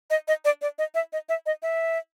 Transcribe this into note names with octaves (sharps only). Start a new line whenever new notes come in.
D#5
D#5
D5
D5
D#5
E5
D#5
E5
D#5
E5